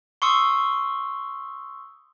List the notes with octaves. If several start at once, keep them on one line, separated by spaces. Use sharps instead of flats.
C6 C#6 D#6 E6